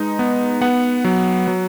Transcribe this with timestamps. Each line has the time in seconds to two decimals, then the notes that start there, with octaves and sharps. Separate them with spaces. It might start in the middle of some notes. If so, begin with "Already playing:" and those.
Already playing: G#3 D#4 B4
0.19 B3
0.61 B3 F#5
1.04 F#3
1.48 F#3